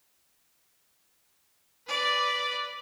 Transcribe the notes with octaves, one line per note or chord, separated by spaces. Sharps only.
B4 D5